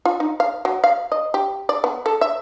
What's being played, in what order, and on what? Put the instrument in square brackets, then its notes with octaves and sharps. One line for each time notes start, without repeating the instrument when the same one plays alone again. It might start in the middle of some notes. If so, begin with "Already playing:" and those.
[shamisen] F4
D#4
F5
F#3
F5
D#5
G4
D5
B3
A4
E5